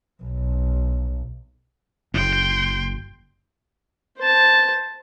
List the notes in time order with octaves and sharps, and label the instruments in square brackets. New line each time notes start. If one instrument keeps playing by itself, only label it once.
[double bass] B1
[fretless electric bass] F#1 [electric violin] G5 C6
[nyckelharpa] C5 A5